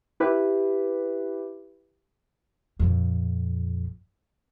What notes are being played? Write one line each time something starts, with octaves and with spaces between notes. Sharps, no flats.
E4 G4 B4
A#1 F2